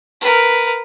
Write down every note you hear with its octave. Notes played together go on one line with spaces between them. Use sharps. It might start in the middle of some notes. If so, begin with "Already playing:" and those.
A#4 B4